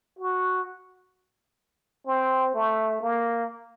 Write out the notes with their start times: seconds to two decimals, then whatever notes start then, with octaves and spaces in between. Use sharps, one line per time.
0.19 F#4
2.07 C4
2.54 A3
3.01 A#3